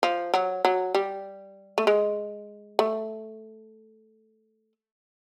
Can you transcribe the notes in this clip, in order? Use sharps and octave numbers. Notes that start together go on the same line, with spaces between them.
F3
F#3
F#3
G3
A3
G#3
A3